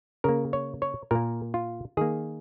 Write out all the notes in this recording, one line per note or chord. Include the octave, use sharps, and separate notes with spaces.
C#3 A#3 A#4
C#5
C#5
A#2 A#3 A#4
F4
D#3 A#3 G#4